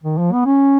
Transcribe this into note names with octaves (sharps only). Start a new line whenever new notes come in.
D#3
F3
B3
C#4